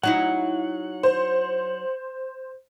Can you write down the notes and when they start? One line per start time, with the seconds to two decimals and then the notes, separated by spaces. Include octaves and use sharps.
0.03 F#3 D#4 E4 F#5
1.03 C5